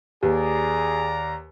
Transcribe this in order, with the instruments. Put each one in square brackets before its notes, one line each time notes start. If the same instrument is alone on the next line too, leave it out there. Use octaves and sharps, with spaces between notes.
[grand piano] D#2 [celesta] G4 B4 [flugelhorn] G#4 [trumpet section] D5 A#5